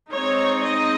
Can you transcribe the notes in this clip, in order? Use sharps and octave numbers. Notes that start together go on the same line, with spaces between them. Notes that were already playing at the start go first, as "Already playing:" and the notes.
G#3 C4 D#4 C#5
D#5